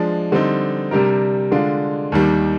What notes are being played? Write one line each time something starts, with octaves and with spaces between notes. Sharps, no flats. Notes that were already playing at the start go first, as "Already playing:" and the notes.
Already playing: F3 G#3 D4
D3 G3 C4 D#4
C3 G3 D4 G4 A#4
D3 G#3 D4 F4
D#2 D#3 G3